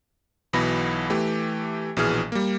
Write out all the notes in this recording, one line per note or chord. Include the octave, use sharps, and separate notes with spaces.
B1 B2 E3 B3 B5 A#6
E3 A3 G4
A#1 B2 E3 G#4 F6
G3 A#3